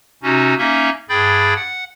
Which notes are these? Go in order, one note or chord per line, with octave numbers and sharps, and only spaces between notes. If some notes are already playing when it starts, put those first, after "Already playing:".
C3 C#4 D#4 F#4
A#3 C#4 D#4 E5
G2 G#4 G5 B5 G6 A6
F#5